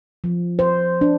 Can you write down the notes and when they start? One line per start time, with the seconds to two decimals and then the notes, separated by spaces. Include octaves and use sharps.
0.24 F3
0.59 C5
1.01 D4